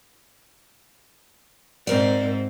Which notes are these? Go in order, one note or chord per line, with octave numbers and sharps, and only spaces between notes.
G#2 C4 A#4 D5